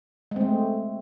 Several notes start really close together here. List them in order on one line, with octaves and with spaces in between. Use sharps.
G#3 C4 A3